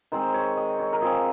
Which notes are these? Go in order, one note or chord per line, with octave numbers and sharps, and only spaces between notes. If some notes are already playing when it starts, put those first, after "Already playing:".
D#3 G#3 C4 C5
C#5
D#5
C#5
A#4
F3 C4 G#4